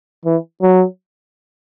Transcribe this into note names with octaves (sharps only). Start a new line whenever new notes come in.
E3
F#3